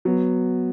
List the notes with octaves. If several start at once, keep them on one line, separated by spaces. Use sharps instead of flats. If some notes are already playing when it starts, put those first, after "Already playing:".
F#3 B3